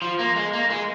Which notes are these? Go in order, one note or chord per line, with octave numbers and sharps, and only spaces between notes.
F3
A#3
G#3
A#3
G#3